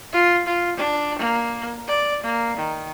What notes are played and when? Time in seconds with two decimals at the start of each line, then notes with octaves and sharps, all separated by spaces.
0.13 F4
0.47 F4
0.77 D4
1.19 A#3
1.88 D5
2.23 A#3
2.57 D#3